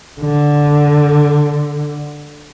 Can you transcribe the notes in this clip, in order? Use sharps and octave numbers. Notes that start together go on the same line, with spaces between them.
D3